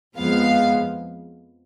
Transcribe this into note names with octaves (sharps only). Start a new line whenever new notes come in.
F2 F3 G#3 B3 F5